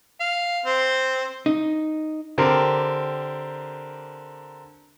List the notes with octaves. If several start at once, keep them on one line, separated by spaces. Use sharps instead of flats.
F5
C4
D#4
D3 C4 G4 A#4